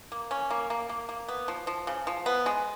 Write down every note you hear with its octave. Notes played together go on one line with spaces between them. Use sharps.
A#3
C#4
A#3
A#3
A#3
A#3
B3
F3
F3
C#3
F3
B3
G#3